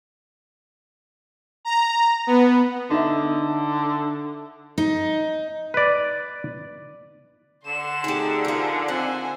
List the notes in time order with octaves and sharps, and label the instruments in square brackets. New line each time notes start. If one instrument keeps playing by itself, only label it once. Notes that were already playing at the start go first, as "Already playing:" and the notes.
[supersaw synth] A#5
B3
[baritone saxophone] D3 [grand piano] D#4 E5
[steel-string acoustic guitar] D#4
[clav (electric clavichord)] B4 D5
[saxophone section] D3 [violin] C6 E7
[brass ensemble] A3 C4 D#4 [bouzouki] G4 G#4
[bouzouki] F3 F4 [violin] G#4 A#4
[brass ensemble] D#3 C4 [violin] C5 G#5 [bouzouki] F#5